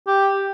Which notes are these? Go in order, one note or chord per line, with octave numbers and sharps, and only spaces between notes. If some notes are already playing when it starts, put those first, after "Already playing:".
G4